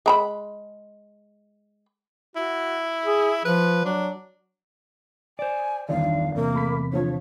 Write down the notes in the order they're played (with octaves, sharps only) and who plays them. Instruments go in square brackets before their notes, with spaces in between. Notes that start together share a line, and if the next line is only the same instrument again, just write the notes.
[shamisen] G#3 A#5 B5
[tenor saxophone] E4 [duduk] F#4
[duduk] G#4
[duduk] F3 [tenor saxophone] B4
[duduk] F#3 [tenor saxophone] D4
[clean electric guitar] C5 D5 [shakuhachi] G#5
[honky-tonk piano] G1 D4 [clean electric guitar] E2 D3 D#3 [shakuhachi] F5
[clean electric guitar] E2 C3 [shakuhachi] A#3
[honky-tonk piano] A3 B5 B6
[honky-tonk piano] D3 F3 [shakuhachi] C#5